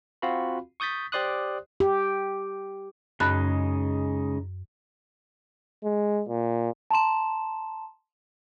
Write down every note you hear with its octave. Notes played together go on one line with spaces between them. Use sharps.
C4 F4 F#4 F5 B5
C#6 D#6 G6 A6 B6
G4 C5 D5 C6 D#6 F#6
G4
F#2 C#3 G#3 D#4 B5 F#6
G#3
A#2
A5 A#5 C6 E7